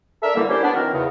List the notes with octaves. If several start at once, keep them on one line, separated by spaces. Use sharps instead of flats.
D4 A4 A#4 E5
F#2 D3 E3 G3 A#3
A#3 C#4 D4 E4 G4 C5
B3 D4
D#3 E3 F#3 C4 A#4
E2 C#3